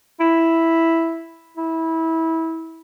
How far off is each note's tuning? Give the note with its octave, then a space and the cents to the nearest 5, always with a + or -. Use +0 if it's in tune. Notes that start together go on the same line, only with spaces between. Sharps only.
E4 +0
E4 -20